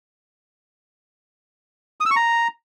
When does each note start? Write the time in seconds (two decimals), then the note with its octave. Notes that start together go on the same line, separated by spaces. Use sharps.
2.00 D#6
2.06 E6
2.11 C#6
2.16 A#5